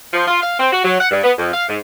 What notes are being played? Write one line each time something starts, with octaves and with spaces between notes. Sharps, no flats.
F3
F4
F5
C4
F#4
F#3
F#5
G2
B3
F2
F5
G#2